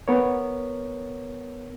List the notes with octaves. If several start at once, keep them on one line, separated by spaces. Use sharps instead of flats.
B3 A#4 C#5